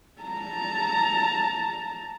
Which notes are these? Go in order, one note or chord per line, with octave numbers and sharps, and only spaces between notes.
A5 A#5